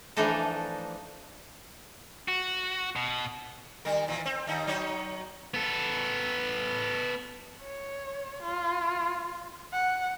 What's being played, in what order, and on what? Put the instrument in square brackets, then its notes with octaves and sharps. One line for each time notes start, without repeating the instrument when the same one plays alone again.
[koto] E3 F3 A3 D4 D#4 A4
[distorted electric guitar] F#4
B2
[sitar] D#3 G3 A#4
A#2 E3
C4
D#2 D#4
F#3 D#4 C#5
[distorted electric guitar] B3 A4
[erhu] C#5
F4
F#5